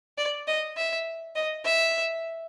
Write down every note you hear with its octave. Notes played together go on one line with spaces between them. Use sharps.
D5
D#5
E5
D#5
E5